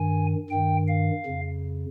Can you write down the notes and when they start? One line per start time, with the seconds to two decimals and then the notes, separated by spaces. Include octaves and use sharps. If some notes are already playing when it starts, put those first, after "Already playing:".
Already playing: G2 D#3 G#5
0.50 G2 D#3 G5
0.88 F5
1.26 F2 C#3